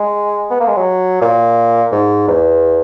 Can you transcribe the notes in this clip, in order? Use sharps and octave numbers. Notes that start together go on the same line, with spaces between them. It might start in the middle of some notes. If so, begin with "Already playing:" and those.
Already playing: G#3
B3
A#3
G#3
F#3
A#2
G#2
E2